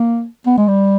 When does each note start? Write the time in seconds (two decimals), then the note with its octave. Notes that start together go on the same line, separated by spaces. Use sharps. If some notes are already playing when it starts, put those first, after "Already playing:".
Already playing: A#3
0.46 B3
0.58 G#3
0.68 G3